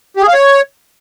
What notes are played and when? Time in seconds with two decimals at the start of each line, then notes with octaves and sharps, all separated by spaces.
0.17 G4
0.22 G#4
0.28 F5
0.34 C#5